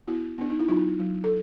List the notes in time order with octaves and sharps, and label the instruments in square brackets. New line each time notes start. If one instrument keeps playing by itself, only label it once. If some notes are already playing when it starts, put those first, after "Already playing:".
[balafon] B3 E4 F#4
B3 D4
D#4
E4
F#3 D#4 F4
F#3
A4